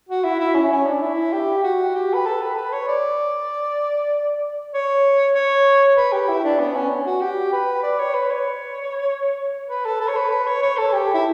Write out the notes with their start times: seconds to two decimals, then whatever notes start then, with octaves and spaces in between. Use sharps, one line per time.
0.09 F#4
0.24 E4
0.40 E4
0.55 C#4
0.71 C#4
0.87 D4
1.02 E4
1.33 G4
1.64 F#4
1.95 G4
2.14 B4
2.26 A4
2.42 B4
2.56 B4
2.73 C#5
2.88 D5
4.74 C#5
5.35 C#5
5.97 B4
6.13 G4
6.29 E4
6.44 D4
6.59 B3
6.75 C#4
7.06 F#4
7.21 G4
7.53 B4
7.83 D5
7.99 C#5
8.14 B4
8.30 C#5
9.69 B4
9.85 A4
10.01 A4
10.08 C#5
10.16 B4
10.31 B4
10.47 C#5
10.63 C#5
10.78 A4
10.93 G4
11.14 E4